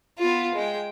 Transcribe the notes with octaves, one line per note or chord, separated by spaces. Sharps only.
B3 F4
G#3 G5